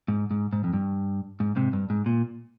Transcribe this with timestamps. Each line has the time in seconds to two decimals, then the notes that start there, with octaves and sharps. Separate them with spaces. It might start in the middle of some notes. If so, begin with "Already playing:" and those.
0.08 G#2
0.31 G#2
0.53 G#2
0.64 F2
0.73 G2
1.40 G#2
1.56 G#2 C3
1.73 G2
1.90 G#2
2.06 A#2